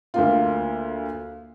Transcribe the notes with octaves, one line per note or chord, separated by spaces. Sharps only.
D2 A#3 F4